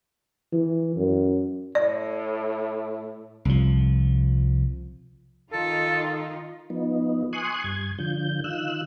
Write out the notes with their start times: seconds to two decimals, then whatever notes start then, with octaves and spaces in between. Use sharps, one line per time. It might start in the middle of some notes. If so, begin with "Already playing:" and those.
0.53 E3
0.97 F#2
1.75 A2 D5
3.45 C2 F3
5.52 D#3 D#4 F4 A4
6.70 F3 B3 D#4
7.33 G#5 C6 C#6 D#6 F#6
7.64 G2 G#6
7.99 D3 F3 G6
8.44 D#3 F4 E6 F#6